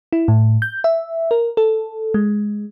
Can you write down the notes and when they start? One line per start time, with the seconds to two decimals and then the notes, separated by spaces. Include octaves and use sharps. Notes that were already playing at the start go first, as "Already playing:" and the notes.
0.13 E4
0.28 A2
0.62 G6
0.84 E5
1.31 A#4
1.57 A4
2.14 G#3